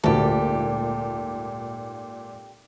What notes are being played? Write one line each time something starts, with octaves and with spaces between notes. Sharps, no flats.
G#1 D2 A#2 G4 A4